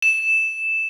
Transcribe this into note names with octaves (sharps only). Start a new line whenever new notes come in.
E7